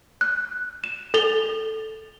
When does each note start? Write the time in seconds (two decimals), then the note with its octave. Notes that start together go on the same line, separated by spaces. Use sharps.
0.21 F#6
0.84 E7
1.14 A4 A6 F7 G7